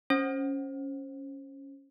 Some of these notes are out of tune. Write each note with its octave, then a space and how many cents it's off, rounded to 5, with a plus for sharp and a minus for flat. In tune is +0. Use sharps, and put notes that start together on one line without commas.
C#4 +0 C5 +15